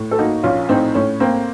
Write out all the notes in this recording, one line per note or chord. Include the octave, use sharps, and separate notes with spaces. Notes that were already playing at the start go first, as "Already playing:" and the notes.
Already playing: A2
A4
A#3 D#4 F#4
A#1 C#4 F4
A2 C4 D#4
A2 C#4
A#3 C4